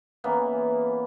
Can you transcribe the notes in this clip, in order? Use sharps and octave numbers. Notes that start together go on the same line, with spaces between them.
C#3 E3 A#3 B3